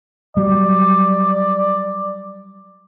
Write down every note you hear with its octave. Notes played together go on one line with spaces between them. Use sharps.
F#3 G3 D5